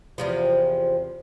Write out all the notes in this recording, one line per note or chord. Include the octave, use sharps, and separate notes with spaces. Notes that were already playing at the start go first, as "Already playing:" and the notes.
E2 C3 F3